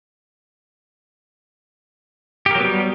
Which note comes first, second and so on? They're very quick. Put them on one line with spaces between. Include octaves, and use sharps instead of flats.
G4 A#4 F#3 B3 G3